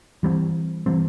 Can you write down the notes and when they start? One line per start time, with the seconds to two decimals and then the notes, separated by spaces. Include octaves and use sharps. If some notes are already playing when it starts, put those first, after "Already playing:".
0.23 E3 G3 C4
0.86 E3 G3 C4